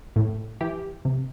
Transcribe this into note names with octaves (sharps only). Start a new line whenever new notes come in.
A2
E3 G4
C3